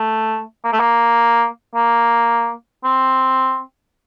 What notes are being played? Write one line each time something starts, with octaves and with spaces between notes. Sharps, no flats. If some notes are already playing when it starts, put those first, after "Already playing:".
Already playing: A3
A#3
A3
A#3
A#3
C4